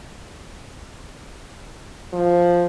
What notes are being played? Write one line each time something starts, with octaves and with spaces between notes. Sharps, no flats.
F3